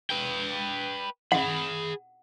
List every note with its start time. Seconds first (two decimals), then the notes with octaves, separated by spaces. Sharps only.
0.10 B4 G5
1.32 G#4 F#5 B5